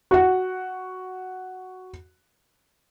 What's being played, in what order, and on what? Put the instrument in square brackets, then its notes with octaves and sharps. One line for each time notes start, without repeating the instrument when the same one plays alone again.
[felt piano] F#4 F#5